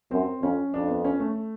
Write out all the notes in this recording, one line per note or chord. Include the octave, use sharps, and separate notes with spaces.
F#2 C4
F2 C#4
F2 D4
B3
C#4
A3